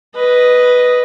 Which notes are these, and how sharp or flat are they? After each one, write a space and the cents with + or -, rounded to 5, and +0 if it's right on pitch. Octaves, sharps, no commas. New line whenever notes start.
B4 +0 D#5 +0